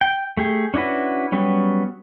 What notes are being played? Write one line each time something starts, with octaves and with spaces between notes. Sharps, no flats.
G5
A3 G4 G#4
C#4 D4 E4 F#4 B4
F#3 G3 B3 C#4